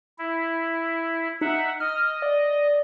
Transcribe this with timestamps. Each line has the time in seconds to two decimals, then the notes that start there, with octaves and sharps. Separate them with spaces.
0.18 E4
1.41 D#4 E5 F#5
1.80 D#5 F6
2.22 D5